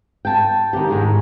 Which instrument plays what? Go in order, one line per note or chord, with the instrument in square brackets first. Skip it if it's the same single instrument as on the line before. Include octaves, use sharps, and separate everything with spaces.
[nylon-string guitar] G5 A5
D#3 D4 G4
G#2 D#3 G#3